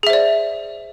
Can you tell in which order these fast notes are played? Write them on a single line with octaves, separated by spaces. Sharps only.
G#4 E5 C5 D5